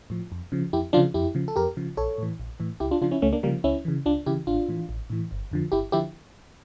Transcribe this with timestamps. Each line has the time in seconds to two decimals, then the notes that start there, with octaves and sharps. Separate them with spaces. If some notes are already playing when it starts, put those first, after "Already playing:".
0.10 A2 F3
0.32 F2
0.52 C#3 F3
0.73 F2 E4 G4
0.93 F3 D4 F4
0.97 C#3
1.14 F2 E4 G4
1.35 C#3 F3
1.48 A4
1.56 F2 G4 A#4
1.77 C#3 F3
1.97 A#1 A4 C#5
2.18 A2 E3
2.40 A#1
2.60 A2 E3
2.80 C#2 E4 G4
2.91 D4 F4
3.02 C#3 F3 D4 F4
3.11 C#4 E4
3.22 C#2 A3 C#4
3.33 A#3 D4
3.43 C#3 G3 A#3
3.46 F3
3.64 C#2 C#4 E4
3.85 C#3 E3
4.06 C#2 D4 F4
4.26 C#3 E3 E4 G4
4.47 A1 D4 F4
4.68 A2 E3
4.89 A1
5.10 A2 E3
5.31 G1
5.52 F2 D3 F3
5.72 G1 E4 G4
5.92 D3 F3 E4 G4